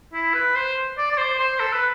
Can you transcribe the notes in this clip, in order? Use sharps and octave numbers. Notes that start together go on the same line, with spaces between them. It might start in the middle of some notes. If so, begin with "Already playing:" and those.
E4
B4
C5
D5
D5
C5
C5
A4
B4